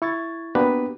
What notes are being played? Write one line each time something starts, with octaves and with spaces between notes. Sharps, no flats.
E4 C#6 G#6 A6
A#3 B3 D4 F#4 G4 B4